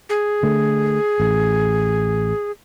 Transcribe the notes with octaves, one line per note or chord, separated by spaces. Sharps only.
G#4
D3 A3
A1